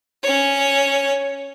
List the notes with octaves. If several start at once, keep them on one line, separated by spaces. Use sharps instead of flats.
C#4 C#5